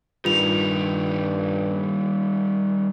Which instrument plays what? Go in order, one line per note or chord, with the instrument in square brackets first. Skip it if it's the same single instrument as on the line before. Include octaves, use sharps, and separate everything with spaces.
[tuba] G2 [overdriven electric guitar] D#3 G3 [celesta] F4 F7